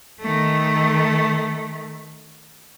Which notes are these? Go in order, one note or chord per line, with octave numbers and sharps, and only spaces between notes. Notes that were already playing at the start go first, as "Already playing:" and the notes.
D#3 A3